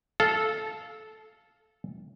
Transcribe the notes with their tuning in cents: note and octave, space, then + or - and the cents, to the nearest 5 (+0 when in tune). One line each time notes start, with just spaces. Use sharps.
A4 -15 F5 +0